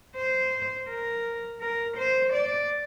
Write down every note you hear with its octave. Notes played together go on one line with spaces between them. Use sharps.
C5
A#4
A#4
C5
D5